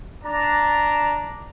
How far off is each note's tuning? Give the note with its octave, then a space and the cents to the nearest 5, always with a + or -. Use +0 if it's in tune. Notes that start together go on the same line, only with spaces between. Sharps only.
D4 +0 A#5 +0